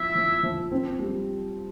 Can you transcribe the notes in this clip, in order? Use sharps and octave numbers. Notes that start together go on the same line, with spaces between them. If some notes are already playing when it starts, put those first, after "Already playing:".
Already playing: F3 C4 E4 E5
F3
F3
C4
G3